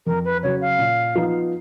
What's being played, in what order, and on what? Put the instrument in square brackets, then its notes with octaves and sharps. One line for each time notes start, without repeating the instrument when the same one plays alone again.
[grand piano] F2 [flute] A#4
[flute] B4
[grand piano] C#3 F#3 [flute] C#5
[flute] F5
[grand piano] A#2
F3 B3 D#4